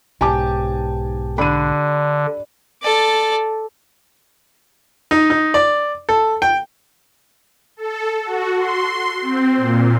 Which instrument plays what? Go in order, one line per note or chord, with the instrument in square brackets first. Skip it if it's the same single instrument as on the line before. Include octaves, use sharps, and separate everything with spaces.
[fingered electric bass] B1 G#2 [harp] G4 [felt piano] G#5 A5 D6
[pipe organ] D3 [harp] D4 [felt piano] B5 D#7
[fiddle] A4 D5
[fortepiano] D#4
D#4
D5
A4
G5
[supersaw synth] A4
F#4
C6
C4
A#2